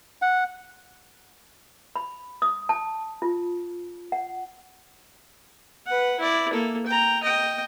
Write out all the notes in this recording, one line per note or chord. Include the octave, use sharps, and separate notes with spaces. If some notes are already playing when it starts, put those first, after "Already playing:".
F#5
B5
D#6
A5
F4
F#5
B4 F#5
E4 D5
A#3 A4
G5 A#5
D#5 G5